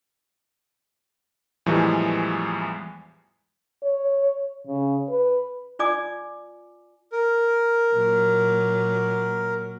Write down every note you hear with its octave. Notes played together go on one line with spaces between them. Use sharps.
E2 A2 E3 F3 G3 G#3
C#5
C#3
B4
F4 D5 G#5 D6
A#4
A#2 F#3